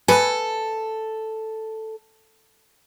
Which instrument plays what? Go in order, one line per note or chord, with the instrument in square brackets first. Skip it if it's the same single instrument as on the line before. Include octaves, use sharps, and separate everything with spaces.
[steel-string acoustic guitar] A4 [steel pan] B4 G#5